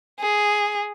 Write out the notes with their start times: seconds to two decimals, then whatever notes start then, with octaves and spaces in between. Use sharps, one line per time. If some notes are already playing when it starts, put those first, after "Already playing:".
0.20 G#4